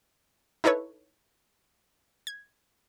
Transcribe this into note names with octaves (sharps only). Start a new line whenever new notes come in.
D#4 E4 A4 B4 C#5
G#6